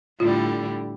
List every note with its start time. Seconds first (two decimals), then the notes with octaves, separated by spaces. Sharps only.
0.20 A2 D3 G3 F4